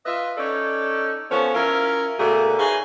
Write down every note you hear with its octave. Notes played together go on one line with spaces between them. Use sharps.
F4 B4 D#5 E5
C#4 D#4 A4 C#5 D5
F3 B3 C#4 A4 C5 C#5
C#4 E4 F4 A#4
B2 D3 A3 A#3 F#4 G#4
D#4 G#4 B4 C#5 E5 F5